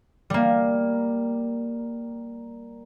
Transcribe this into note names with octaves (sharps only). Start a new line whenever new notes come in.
G3 A#3